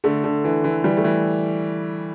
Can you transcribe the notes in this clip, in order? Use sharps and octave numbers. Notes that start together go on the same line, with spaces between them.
D3 A3
D3
E3
E3
E3 G3
A3
E3